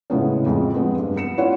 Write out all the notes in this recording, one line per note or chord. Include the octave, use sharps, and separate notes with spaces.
A2 C#3 G#3 B3 C#4
F2 G#3
G#3 B3 C4
G2
B3 C#7 E7
C#4 E4 F4 C#5 F#5